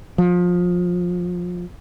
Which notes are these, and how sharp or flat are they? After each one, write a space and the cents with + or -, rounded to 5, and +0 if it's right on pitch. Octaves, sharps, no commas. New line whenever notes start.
F3 +25